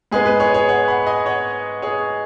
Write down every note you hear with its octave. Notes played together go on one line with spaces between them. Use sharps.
G#2 G#3 B3 G#4
B4
G#4 C#5
G#4 C#5
C#5 F#5
F#5 B5
D#5 G#5
C#5 F#5
G#4 C#5